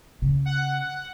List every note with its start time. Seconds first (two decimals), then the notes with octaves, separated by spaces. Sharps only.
0.22 C#3
0.45 F#5